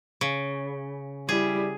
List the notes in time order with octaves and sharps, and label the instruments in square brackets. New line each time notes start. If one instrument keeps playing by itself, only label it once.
[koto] C#3
[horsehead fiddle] G3 E4 [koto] G#4